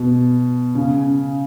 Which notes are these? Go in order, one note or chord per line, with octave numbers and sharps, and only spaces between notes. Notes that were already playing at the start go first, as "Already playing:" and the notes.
Already playing: B2
C#3